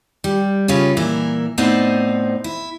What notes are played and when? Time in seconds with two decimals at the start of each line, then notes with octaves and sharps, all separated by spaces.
0.24 G3
0.68 C#3 C#4 E4 F4
0.97 A#2 E3 E4 A#4
1.58 A2 B3 C4 D#4 C5 D5
2.44 E4